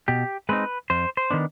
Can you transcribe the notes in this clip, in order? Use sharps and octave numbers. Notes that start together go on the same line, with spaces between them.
B2 G4
G#3 C4 D#4 B4
F2 C5
C5
D#3 B3 D4